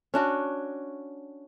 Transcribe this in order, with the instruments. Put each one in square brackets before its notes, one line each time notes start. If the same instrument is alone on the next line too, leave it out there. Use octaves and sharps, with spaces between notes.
[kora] C#4 D4 F#4